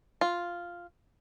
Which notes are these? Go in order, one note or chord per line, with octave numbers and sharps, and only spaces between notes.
F4